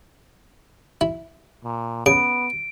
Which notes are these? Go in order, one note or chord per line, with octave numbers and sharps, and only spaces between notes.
E4
A#2
C#3 B3 D7